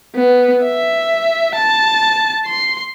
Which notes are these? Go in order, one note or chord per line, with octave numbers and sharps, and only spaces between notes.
B3
E5
A5
C6